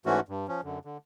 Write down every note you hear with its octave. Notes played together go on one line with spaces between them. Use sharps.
G#2 E3 A3 C#4 F#4
G2
F3 C#4
F#2 D3
D3